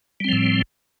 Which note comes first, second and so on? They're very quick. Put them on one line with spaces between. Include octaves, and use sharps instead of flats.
G3 C4 F3 A2